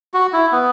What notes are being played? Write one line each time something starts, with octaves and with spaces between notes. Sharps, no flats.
F#4
E4
B3